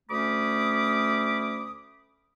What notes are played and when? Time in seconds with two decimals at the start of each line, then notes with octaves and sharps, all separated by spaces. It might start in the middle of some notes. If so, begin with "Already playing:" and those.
0.09 D2 A3 C#4 B5 D6 D#6